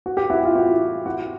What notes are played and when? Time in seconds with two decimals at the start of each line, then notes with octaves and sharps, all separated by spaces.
0.06 F#4
0.17 G4
0.30 E4 F#4
0.45 F4
0.55 E4 F#4
1.06 E4 F#4